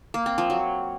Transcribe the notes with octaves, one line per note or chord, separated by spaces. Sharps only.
A#3
C4
F3
F#3